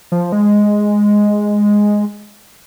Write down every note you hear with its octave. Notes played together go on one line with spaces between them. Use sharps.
F3
G#3